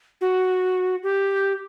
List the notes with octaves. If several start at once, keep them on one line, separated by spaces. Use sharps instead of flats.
F#4
G4